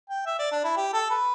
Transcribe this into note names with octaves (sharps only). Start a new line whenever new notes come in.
G5
E5
D5
D4
E4
G4
A4
B4